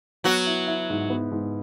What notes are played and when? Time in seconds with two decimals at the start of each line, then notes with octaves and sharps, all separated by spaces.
0.24 F#3 B3 F#4
0.47 E4
0.67 E4
0.90 G#2
1.10 B3
1.32 G#2